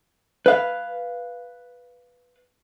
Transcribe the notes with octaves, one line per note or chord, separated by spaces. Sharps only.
B4 F5